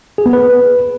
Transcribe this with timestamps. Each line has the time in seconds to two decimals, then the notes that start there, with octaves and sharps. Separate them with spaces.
0.18 G#4
0.26 B3
0.33 B4